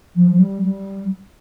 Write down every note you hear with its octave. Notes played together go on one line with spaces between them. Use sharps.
F3
F3
G3
G3